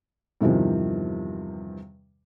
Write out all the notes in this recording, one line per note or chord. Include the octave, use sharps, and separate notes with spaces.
E2 G2 C3 D#3 F3